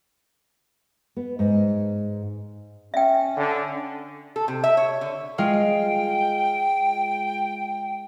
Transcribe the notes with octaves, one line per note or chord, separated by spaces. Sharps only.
B3
G#2
C#4 E5 G5
D3
A4
C3
E5
C#5
D3
G#3 F4 F5 G5